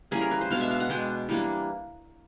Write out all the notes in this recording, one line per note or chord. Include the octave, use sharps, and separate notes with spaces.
E3 G3 A#3 C#4 G#4
A#4
B4
C5
B2 G#3 B3 D4 F5
E5
F5
F#5
B2 G#3 B3 D4 G5
E3 G3 A#3 D4